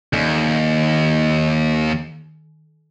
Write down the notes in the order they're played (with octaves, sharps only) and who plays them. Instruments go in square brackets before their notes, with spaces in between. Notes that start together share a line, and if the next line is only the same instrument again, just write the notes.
[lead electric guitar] D#2 [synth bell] D#3